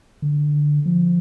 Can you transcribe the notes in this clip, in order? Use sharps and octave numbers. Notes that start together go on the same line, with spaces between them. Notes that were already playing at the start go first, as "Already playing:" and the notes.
D3
F3